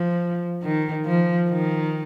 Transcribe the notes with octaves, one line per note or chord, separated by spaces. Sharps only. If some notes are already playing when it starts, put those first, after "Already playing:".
Already playing: F3
D#3
F3
D#3